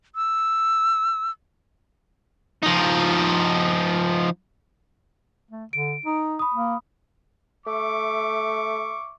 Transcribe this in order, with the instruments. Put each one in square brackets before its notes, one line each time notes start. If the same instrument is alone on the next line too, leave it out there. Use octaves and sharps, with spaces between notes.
[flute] E6
[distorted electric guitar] F3 D#4
[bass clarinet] A3
[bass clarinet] D3 [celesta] D7
[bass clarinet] D#4
[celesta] B5 D#6
[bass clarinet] A#3
[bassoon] A3 [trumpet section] E5 C#6 D6